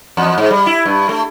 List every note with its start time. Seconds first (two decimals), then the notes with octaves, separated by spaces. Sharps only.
0.17 E2
0.38 G#2
0.51 G3
0.66 E4
0.86 G2
1.09 A3